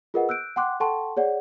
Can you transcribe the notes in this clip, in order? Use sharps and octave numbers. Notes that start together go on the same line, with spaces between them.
F4 G#4 A#4 B4 D#5 F#5
E6 F#6 G6 D7
F#5 G5 C6 D6 F#6
A4 F#5 G5 A5 C6 C#6
G#4 C#5 D5 F#5